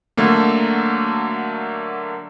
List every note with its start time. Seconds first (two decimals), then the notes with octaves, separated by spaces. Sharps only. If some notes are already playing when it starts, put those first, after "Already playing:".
0.17 D3 F#3 A3 A#3